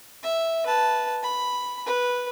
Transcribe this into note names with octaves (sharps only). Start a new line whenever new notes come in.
E5
B4 A5
B5
B4